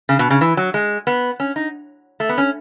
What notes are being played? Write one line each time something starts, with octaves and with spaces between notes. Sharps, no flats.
C#3
B2
C#3
E3
F#3
G#3
B3
C#4
D#4
A3
B3
C#4